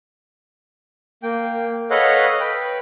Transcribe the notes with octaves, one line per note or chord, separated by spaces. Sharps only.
A#3 G5
A4 B4 C#5 D#5 F5 F#5
B4 G5